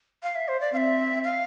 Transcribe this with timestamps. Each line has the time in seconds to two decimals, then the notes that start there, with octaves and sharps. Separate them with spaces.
0.23 F5
0.35 E5
0.48 C5
0.61 D5
0.73 C4 E5 F5
1.24 F5